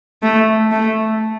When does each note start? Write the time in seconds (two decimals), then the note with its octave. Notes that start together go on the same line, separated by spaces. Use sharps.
0.23 A3
0.72 A3